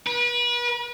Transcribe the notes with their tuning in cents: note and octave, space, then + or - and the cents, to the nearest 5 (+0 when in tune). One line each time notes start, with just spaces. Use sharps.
B4 -35